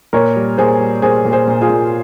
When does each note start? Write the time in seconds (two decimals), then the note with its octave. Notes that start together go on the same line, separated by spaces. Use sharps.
0.13 A#2 A#4 C#5
0.36 G3
0.58 A#2 G#4 C5
0.80 G3
1.02 A#2 G#4 C5
1.25 A#2
1.32 G#4 C5
1.48 A#2
1.61 F4 G#4
1.70 A#2